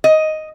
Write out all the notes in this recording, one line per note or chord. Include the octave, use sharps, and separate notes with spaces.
D#5